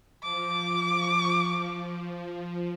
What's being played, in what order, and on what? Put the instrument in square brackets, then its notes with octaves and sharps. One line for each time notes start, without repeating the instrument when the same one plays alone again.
[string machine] F3 [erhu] D6